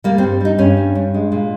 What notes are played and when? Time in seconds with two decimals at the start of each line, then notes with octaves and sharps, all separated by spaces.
0.04 G3 A#3
0.18 C4
0.23 G2
0.41 G3 D#4
0.58 G2 C#4
0.77 G3
0.95 G2
1.14 G#3
1.32 A#2